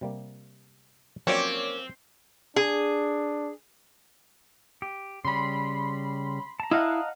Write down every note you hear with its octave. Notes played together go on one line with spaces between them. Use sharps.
C3 G3 A#3
F3 F#3 A#3 C4 C#4 C#5 D5
D4 G#4
G4
C#3 G3 B5 C6
A5 A#5
E4 D#5 F5 F#5